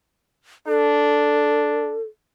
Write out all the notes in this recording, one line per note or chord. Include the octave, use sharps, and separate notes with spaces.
D4 A4